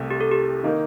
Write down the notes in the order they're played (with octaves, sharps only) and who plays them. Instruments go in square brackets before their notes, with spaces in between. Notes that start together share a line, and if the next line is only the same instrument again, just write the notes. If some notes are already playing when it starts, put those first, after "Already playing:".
Already playing: [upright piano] C2 C3 A3
[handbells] G4
A4
G4
[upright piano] D#3 A#3 D#4